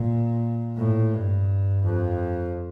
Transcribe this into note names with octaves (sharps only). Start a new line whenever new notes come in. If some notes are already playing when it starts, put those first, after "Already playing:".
Already playing: A#2
A2
G2
F2